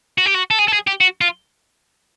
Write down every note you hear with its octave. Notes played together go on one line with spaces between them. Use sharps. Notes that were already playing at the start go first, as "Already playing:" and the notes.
F#4
G4
F#4
A4
G#4
A4
G#4
G4
F#4
F4